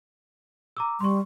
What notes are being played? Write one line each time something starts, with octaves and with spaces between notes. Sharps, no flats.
A#5 D6 E6
G3 C6 C#6